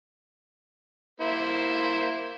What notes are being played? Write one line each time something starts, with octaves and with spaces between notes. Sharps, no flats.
A#3 E4 C5